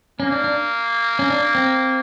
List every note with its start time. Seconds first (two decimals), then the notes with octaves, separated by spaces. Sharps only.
0.20 A#3 C#4
0.32 D4
0.44 D4
1.19 C#4
1.30 D4
1.55 C4